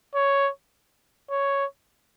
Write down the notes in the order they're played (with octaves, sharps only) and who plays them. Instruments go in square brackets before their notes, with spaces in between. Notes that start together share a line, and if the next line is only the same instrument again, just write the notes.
[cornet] C#5
C#5